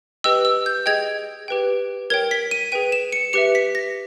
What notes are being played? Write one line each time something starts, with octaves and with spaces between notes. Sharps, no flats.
G4 B4 D#5 G5 E6
E6
G6
G#4 D#5 G5 G#6
G4 B4 G5
A#4 C#5 G5 G#6
B6
D#7
G#4 B4 G5 D#7
E7
C#7
G4 B4 E5 C#7
B6
A#6